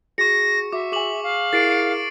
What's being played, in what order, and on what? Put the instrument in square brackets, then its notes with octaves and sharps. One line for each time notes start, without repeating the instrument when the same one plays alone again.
[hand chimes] F#4 G#4 [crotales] C#6 C#7 [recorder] A#6
[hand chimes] F#4 [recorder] E5 [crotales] D6
[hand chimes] G#4 G#5 [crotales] C#6 D6 F#7
[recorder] F5
[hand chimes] E4 G#4 A#4 [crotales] A6 C7 D7
[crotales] C#7 D7